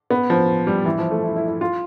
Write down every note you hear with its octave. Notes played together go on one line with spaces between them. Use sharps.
B3
F3
G3
E3
F3
A3
E4
E4
E4
F4